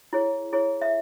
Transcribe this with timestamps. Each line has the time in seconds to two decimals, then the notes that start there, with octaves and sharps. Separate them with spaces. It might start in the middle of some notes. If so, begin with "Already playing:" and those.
0.13 E4 G#4 C#5
0.53 E4 G#4 C#5
0.82 E5